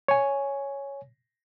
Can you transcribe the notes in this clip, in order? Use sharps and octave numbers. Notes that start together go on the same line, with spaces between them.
C#5 G#5